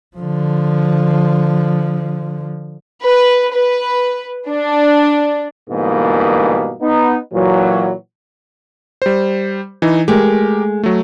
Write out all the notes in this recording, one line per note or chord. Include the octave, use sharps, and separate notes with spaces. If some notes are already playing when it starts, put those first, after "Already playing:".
D3 F3
B4
B4
D4
G#2 B2 D3 E3 G3 A#3
B3 D#4
A#2 E3 F#3
G3 C5
E3 D#4
G#3 A3 G4 A#4
F#3 A3